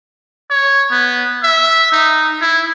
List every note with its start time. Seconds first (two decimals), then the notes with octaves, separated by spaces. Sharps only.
0.50 C#5
0.91 B3
1.43 E5
1.92 D#4
2.41 E4